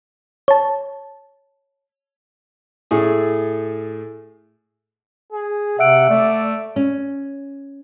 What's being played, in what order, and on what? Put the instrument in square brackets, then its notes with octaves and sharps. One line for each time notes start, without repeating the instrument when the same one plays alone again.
[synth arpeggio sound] C#5 A5
[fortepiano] A2 A3 G#4
[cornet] G#4
[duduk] C3 [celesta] E5 E6 D7 [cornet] F#5
[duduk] A3 [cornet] D5
[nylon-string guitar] C#4